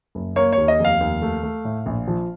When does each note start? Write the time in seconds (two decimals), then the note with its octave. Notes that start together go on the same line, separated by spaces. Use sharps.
0.15 F#1
0.36 A#3 C#5
0.52 C#5
0.58 D#2
0.68 D#5
0.79 F1
0.85 F5
1.00 D#2
1.22 A3
1.43 A3
1.65 A2
1.86 A#1
2.07 F3